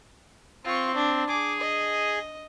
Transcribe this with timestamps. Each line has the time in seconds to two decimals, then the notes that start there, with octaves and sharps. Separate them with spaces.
0.65 C4 F4 C#6
0.95 D4
1.28 G#4 D6
1.61 D#5